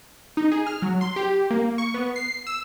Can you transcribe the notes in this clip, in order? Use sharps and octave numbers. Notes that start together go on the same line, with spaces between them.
D#4
G#4
F6
F#3
C6
G4
A#3
C#6
B3
C7
E6